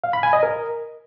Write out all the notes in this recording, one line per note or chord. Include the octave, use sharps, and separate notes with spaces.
F5
B5
G#5
D#5
A#4